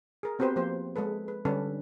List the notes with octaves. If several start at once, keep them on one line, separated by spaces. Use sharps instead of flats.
G#4 A#4
B3 C4 F#4 G4 B4 C5
F3 A#3 G4 C5
G#3 G#4 A4 B4
B4
D3 G3 C#4 D4 A4 B4